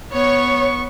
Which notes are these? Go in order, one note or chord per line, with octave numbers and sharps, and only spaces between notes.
B3 C#5 C#6